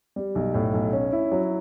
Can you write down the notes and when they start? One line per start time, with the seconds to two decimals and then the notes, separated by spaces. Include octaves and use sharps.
0.16 G3
0.35 B1
0.54 A2
0.73 B1
0.93 C#4
1.12 E4
1.32 F#3